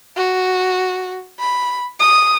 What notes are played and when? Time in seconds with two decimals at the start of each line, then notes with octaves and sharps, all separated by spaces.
0.17 F#4
1.40 B5
2.00 D#6